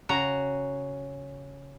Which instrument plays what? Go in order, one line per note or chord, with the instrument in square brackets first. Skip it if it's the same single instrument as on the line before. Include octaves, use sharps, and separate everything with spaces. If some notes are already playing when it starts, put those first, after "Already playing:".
[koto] C#3 F#4 A#5